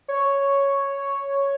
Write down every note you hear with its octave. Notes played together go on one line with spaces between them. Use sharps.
C#5